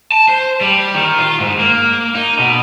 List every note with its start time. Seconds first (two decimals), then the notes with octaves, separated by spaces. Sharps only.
0.12 A5
0.29 C5
0.61 G3
0.94 D#3
1.19 F4
1.40 G#2
1.59 A#3
2.15 D#4
2.39 B2